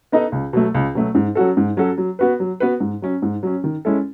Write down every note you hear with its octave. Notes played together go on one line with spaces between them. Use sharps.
B3 D#4 A4 D#5
C#2
B2 F#3 A3
C#2
B2 F#3 A3
G#2
F#3 C#4 F#4 A4
G#2
F#3 C#4 F#4 A4
F#3
B3 F#4 B4
F#3
B3 F#4 B4
G#2
F#3 C#4
G#2
F#3 C#4
D#3
G#3 C#4 E4 A4